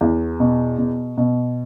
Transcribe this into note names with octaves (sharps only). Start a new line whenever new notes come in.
E2
B2
B2
B2